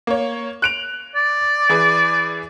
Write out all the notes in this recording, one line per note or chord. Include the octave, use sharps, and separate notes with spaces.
A#3 C#5
F#6 D7 F7
D5
E3 G#4 B4